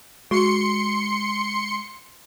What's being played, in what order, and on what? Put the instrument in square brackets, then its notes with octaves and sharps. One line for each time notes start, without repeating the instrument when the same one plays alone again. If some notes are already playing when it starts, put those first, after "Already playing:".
[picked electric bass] G#3 [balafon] F#4 [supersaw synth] C6 C#7